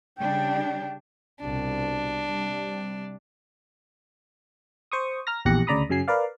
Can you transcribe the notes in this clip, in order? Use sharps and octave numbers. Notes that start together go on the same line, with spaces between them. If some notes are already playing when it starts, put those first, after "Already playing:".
C#3 G3 D4 G5
C2 B2 G3 D4
C3 G3
C5 C#6 D#6
A#5 F6 A#6
A#1 E2 G4 F#6 A#6 C#7
D2 C#3 D5 A#5 B5 D#6
F#2 C#3 F#3 G#5 C7
A#4 B4 D5 F5